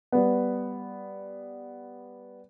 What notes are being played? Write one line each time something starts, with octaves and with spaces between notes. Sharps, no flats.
G3 B3